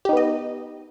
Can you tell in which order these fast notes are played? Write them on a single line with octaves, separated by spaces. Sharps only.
G4 D#4 B3 D#5